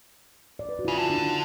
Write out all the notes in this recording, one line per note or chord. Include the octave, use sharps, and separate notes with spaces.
D5
B4
F#4
E4
C#3 F4
D3
D4
D#4